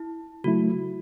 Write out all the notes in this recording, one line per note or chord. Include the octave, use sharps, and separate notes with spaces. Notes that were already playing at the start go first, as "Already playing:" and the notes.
Already playing: E4
C#3 F#3 A3 E4 F#4